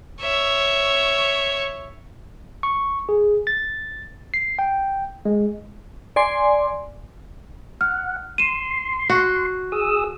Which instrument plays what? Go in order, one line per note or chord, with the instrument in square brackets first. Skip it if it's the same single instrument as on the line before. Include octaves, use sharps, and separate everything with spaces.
[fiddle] C#5 E5
[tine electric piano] C#6
G#4
A6
C7
G5
G#3
[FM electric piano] D5 G#5 C6
[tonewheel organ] F#5 [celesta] F6
[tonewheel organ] C6 [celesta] D#7 E7
[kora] F#4
[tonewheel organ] G#4 D#6 E6